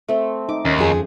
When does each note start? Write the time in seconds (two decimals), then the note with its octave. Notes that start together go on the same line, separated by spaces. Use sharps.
0.08 A3 C4
0.49 D#4 D6
0.65 D#2 C#4
0.79 F2 F3 G#4